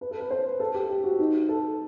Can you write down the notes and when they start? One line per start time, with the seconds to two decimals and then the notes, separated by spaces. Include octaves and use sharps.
0.01 B4
0.11 A4
0.21 B4
0.30 C5
0.60 A4
0.74 G4
0.89 G4
1.04 F#4
1.19 D#4
1.49 A4